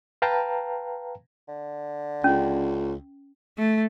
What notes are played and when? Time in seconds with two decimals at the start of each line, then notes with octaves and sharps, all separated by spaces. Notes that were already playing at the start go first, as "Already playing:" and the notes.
0.22 B4 F5 G5 A5 A#5
1.48 D3
2.24 C#2 C#4
3.58 A3